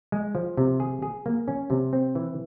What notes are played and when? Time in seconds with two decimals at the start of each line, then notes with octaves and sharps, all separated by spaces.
0.12 G#3
0.35 F3
0.57 C3
0.80 G#4
1.02 G#4
1.26 A#3
1.48 C#4
1.70 C3
1.93 C4
2.15 E3